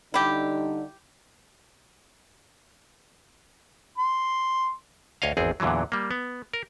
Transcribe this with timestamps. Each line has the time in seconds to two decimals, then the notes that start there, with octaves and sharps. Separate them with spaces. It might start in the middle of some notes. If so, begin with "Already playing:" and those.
0.14 D3 G3 D#4 E4 G4
3.98 C6
5.22 D2 C#5 D#5 F5
5.37 G#1 E2 C4 G#4
5.60 E2 A#2 D3 E3 F#3
5.92 G3 A#3
6.11 B3
6.54 A#4